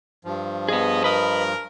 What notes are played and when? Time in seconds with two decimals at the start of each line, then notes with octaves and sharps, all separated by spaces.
0.25 G2 F3
0.69 B3 G#4 D#5
1.04 A#4 B4 D#5